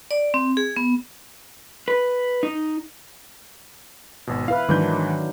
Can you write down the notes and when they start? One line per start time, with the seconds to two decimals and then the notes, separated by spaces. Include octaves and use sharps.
0.11 D5
0.34 C4
0.57 G#4
0.76 B3
1.88 B4
2.43 D#4
4.27 G#1 B2
4.48 E4 B4 F5 F6
4.69 G#2 D#3 E3 F#3 D4 G6